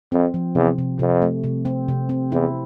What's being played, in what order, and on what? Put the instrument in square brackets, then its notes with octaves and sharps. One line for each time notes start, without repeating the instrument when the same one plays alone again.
[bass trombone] F2 [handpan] C4
[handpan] F3
[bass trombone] E2 [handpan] C3
[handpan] C3
[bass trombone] F2 [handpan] C3
[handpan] A3
C3
C4
C3
C4
[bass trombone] E2 [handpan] E4